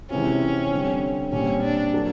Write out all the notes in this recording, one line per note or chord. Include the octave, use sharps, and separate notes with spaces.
C3 E3 G#3 C4 C#4 F4
D3 G3 C4
A#2 G3 C4 C#4
D4
F#3 A#3 D4